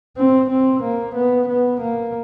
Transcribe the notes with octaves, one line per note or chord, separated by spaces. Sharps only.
C4
C4
A#3
B3
B3
A#3